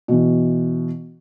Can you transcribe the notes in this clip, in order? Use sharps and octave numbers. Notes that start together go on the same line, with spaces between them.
B2 E3